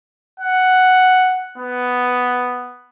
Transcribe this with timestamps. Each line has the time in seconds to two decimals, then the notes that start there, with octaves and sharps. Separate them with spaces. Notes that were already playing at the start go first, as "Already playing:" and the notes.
0.40 F#5
1.58 B3